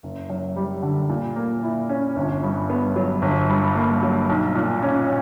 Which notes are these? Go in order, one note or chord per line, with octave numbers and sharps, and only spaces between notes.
F#1
F#2
G3
D3
A#2
A#3
E4
C#4
G1
G2
B3
F#3
G1
G2
A#3
F#3
B1
A#2
C#4